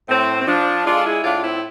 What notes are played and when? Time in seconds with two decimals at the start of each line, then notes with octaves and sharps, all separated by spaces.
0.09 A2 C4
0.40 C4
0.47 F3 D4
0.86 G#3 D4 F4
0.97 A4
1.05 E4 G#4
1.24 A2 D4 F4
1.44 C4 E4